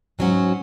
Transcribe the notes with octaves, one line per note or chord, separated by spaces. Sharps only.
G#2 F#3 C#4 F#4